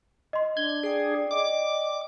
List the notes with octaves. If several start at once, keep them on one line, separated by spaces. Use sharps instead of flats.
D#5 C6
D4 G#6 G7
G#4 D5 G5
D#5 D6